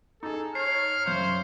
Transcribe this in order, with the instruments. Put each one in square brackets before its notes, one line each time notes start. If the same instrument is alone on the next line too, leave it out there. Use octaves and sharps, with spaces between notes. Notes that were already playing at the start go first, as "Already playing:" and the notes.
[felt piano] D#4 G#4 [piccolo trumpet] A4
[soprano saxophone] C#5 [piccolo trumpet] F6 [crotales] C7
[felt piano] F#2 C#3 [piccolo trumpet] C5